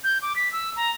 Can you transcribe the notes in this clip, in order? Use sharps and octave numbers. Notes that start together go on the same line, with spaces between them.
G6
D6
B6
E6
A#5